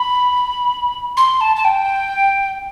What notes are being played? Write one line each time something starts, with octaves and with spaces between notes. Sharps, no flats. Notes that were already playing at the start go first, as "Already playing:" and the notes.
Already playing: B5
C6
A5
A5
G5